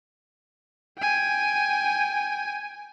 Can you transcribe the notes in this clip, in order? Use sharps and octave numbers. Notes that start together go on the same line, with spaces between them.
G5 G#5